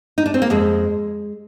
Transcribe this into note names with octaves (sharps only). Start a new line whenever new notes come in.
D#4
D4
C4
A#3
F2 G#3